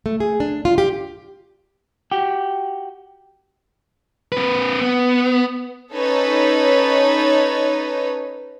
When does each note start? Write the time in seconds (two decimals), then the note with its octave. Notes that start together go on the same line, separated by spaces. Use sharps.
0.06 A3
0.20 G#4
0.40 D4
0.65 F4
0.78 G4
2.11 F#4 G4
4.32 C4 B4
4.82 B3
5.93 C#4 D#4 A4 B4 C#5